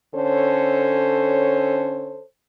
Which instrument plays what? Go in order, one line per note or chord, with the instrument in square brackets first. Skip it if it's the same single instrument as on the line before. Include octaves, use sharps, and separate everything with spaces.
[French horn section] D3 C#4 A4 C5 C#5